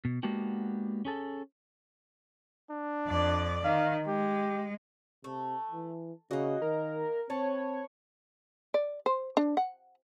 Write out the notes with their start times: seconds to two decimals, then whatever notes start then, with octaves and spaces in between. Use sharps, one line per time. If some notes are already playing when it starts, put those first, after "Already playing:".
0.05 B2
0.23 G#3 A#3 B3 D4 F#4 G4
1.05 C#4 G#4 A4
2.70 D4
3.06 F2 D5
3.64 D#3 F5
4.07 G#3 G4
5.24 C3 A3
5.71 E3
6.31 C#3 A#3 F#4 D#5
6.62 D#3 A#4
7.30 C4 B4 C#5 A5
8.74 D5
9.06 C5
9.37 D4
9.57 F#5